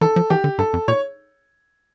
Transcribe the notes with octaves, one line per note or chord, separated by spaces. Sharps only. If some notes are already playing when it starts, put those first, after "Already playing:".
E3 A4
F3
E3 G4
D3
G2 A4
F2
A#2 C#5